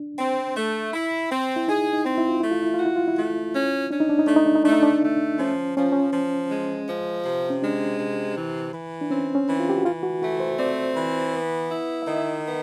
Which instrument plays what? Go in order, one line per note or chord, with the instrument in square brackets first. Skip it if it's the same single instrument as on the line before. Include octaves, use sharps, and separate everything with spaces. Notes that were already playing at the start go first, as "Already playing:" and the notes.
Already playing: [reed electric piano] D4
[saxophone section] C4
A3
E4
C4
[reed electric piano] E4
[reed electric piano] D#4 [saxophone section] G#4
[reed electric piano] D#4
[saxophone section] C4
[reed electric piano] E4
F4
[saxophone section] A3 [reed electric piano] E4
[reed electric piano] F4
E4
F4
[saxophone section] F#4
[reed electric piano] E4
F4
E4
[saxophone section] A3
C#4
[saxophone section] C#4 [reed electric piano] D4
[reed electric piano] D#4
D4
D#4
[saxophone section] A3 [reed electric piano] D4
[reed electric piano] D#4
D4
D#4
[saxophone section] A3 [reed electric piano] D4
[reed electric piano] D#4
D4
[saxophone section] A3
[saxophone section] F3 [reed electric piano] C#4
[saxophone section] F3 [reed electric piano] C#4
[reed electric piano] C#4
[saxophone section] F3
G#3
F3
C3
[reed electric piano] C#4
[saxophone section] G#3 [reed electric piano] D4
[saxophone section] C3
E3
E3
[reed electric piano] D4
[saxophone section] C4 [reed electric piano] C#4
[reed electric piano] C#4
[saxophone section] E3
[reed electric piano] F4
G4
F#4
[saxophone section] E3 [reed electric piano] F4
[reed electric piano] F#4
[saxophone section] A3 [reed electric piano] F#4
[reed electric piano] C5
[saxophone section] C4 [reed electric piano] D5
[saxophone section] E3
B3
E4
[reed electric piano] E5
[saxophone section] D#3 [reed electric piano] D#5
[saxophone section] B3